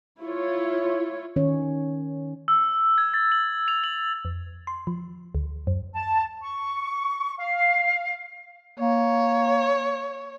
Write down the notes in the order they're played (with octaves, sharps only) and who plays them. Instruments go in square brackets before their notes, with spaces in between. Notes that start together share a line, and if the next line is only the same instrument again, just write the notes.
[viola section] E4 F4 C#5
[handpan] D#3 C#4 C#5
[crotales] E6
G#6
A6
F#7
F7
F#7
[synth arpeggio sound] F2
C6
F3
D2
F#2
[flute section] A5
C#6
F5
[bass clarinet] A#3 [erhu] C#5